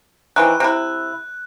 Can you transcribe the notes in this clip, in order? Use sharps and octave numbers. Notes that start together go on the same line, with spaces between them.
D#3 E3 C4 F#6
C3 E4